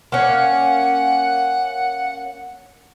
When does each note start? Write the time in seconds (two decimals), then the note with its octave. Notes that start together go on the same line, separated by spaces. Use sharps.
0.12 A#3 C#4 F#5